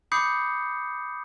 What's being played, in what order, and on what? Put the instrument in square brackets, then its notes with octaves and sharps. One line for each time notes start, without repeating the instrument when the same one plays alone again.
[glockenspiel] B5 D6 D#6 G6 C7 C#7